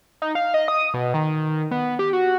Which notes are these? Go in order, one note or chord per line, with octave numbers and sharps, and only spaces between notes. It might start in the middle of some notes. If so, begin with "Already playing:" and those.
D#4
F5
D#5
D#6
B2
D#3
B3
G4
F#4